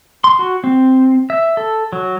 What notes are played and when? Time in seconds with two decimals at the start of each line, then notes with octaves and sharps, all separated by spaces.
0.24 C6
0.39 F#4
0.64 C4
1.30 E5
1.57 A4
1.93 F#3